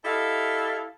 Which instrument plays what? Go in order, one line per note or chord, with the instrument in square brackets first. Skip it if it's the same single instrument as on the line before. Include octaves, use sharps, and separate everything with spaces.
[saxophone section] E4 G4 A4 D#5 F5